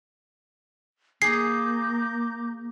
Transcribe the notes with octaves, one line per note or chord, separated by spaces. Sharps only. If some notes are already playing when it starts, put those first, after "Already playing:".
A#3 G#4 A#5 D6 G6 C7